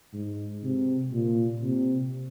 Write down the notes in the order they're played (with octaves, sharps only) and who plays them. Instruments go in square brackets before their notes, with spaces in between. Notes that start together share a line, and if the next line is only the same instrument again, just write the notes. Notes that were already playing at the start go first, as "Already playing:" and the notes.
[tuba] G#2
C3
A#2
C3